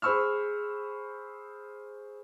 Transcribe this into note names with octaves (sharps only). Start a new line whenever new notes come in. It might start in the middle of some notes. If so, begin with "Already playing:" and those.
G#4 C5 B5 C#6 E6 F6